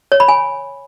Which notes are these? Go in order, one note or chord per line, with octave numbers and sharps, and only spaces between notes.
C#5
B5
G#5